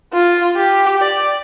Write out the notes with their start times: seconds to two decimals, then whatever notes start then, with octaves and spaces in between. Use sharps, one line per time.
0.13 F4
0.57 G4
1.01 D5